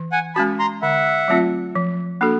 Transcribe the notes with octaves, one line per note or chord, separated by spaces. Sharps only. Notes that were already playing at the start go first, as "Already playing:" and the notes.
Already playing: E3
F#5 G#5
G#3 C#4 F#4 A5 B5
A#5 C6
D3 E5 F#5
F#3 A3 C4 F4
F3
A#3 D4 F#4 A4